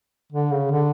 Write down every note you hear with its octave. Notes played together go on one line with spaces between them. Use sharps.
D3
C#3
D3